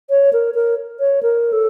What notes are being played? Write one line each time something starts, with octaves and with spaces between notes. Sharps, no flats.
C#5
A#4
A#4
C#5
A#4
A4